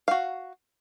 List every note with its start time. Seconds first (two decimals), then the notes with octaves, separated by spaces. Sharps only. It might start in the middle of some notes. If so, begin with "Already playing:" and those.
0.08 F#4 F5